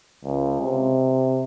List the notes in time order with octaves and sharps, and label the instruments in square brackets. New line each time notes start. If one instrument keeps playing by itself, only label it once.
[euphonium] C#2
C3